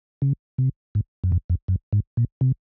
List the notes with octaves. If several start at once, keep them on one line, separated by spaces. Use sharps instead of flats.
C#3
C3
G#2
F#2
F2
F2
F#2
G#2
A#2
C3